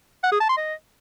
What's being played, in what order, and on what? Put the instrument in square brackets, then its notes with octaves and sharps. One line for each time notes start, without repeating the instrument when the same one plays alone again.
[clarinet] F#5
G#4
A5
C6
D#5